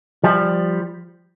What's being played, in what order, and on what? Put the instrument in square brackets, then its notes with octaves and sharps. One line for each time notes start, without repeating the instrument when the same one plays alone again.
[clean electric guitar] F3 G3